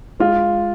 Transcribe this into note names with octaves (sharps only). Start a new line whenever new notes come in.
G#3 F4